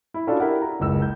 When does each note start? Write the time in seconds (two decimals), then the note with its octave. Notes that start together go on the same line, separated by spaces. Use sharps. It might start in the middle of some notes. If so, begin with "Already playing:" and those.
0.14 E4
0.27 C#4 D4 F4 F#4 A4 D5
0.40 E4 G4 A#4 F#5
0.62 A#5
0.80 F#1 C#2 E6
1.02 G6